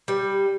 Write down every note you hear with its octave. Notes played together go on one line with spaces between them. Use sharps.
G3